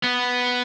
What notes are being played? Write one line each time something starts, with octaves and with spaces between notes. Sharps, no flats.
B3